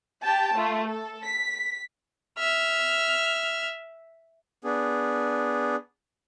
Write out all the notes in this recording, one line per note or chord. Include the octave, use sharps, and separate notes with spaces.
G4 G5 A5
A3 F4
A4
B6
E5 F6
B3 D4 G#4